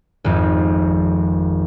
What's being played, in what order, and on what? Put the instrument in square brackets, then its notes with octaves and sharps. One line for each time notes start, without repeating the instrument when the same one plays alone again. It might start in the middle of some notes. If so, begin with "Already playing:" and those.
[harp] G#1 F2